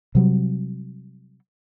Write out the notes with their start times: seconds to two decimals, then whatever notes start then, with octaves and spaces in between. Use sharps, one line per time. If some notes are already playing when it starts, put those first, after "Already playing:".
0.15 C3 F#3 G3